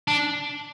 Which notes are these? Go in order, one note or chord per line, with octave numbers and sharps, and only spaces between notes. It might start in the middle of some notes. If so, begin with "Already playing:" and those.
D4